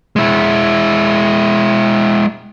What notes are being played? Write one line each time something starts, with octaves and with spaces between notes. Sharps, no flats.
G#3 E4